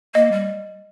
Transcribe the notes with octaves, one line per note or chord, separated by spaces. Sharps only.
A#3 D#5
G3